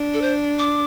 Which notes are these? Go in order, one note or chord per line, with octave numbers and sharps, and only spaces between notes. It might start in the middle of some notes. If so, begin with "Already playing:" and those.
Already playing: D4
A4
C5
D6